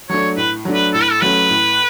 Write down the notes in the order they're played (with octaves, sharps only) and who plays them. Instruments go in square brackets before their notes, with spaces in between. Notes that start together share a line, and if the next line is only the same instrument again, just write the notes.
[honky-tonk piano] F#3 A3 D4 [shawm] C#5
[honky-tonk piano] A2 [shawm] B4
[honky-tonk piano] F#3 A3 D4
[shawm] B4
[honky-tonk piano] A2 [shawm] A4
[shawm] B4
A4
[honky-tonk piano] F#3 A3 C#4 [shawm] B4
[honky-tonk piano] A2